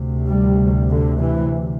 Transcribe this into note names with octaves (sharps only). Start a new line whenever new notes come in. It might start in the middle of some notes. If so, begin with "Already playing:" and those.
Already playing: D2 C3
G3
D3
E3